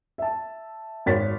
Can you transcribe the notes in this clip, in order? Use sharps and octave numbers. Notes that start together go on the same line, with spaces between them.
E5 A5
G#1 C#5 A6 B6